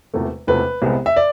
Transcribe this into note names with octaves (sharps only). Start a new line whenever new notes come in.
E1 E2 C3 F3 A3
E1 E2 C3 F3 A3 B4
C2 C3 G#3 B3
E5
D5